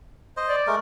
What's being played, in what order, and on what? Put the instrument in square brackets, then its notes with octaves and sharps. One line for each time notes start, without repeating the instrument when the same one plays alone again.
[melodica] C5 D#5
[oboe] D5
[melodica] G#3 A3 A#4